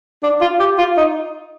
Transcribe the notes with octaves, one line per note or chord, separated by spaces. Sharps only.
D4
F4
G4
F4
D#4